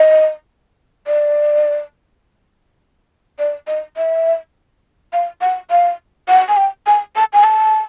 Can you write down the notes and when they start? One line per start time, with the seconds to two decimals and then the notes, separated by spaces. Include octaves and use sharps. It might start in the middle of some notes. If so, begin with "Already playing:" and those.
Already playing: D#5
1.07 D5
3.39 D5
3.67 D#5
3.97 E5
5.13 F5
5.41 F#5
5.70 F5
6.28 F#5
6.49 G#5
6.57 G5
6.87 G#5
7.16 A5
7.33 G#5
7.44 A5